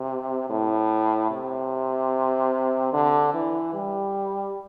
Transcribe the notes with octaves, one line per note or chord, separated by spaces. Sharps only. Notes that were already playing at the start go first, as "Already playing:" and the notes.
Already playing: C3
A2
C3
D3
E3
G3